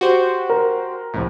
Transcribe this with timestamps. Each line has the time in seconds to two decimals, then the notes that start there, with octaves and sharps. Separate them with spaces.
0.01 F#4 G4 C5
0.49 A#4
1.14 C2 F2 A2